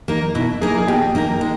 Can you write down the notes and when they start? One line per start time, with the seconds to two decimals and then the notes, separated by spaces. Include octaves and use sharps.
0.08 A#3 D#4 A#4
0.35 B2 E4
0.61 A#3 D#4 G#4 A#4
0.77 G#4
0.88 B2 G4
1.15 A#3 D#4 A#4
1.41 G#3